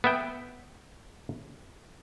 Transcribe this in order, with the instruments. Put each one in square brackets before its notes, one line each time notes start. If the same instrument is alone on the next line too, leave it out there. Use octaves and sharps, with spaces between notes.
[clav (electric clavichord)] B3 E5 G5